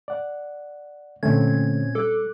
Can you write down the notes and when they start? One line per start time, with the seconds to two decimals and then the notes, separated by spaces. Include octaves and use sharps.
0.08 D5 F#5
1.23 A#2 D3 A3 C4 C#4 G#6
1.95 G3 A4 D6 F#6